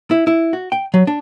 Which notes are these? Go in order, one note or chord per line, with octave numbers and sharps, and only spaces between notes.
E4
E4
F#4
G5
F#3
D4